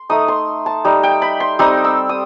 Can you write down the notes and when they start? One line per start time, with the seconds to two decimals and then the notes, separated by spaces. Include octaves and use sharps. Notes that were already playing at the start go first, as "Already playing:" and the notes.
Already playing: C6
0.10 A3 D#4 D#6
0.28 C6
0.66 A5
0.85 G3 D#4
1.03 G5
1.22 B5
1.40 C6
1.59 G3 C4 D#4 D#6
1.84 E6
2.09 D#6